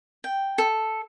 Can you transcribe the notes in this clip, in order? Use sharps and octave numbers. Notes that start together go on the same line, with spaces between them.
G5
A4